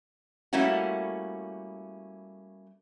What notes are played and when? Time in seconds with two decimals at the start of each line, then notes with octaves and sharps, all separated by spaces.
0.53 G3 A3 A#3 C#4 E4 F#4